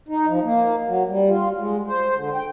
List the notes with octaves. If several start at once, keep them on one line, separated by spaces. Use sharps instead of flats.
D#4
F3
A#3
F#3
G3
F4
G#3
C5
D3
G5